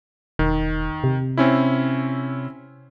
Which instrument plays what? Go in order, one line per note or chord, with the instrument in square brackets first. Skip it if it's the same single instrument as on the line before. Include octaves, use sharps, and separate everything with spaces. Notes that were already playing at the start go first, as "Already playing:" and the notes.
[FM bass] E1 [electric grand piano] D#3
[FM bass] C3
[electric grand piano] C4 C#4 E4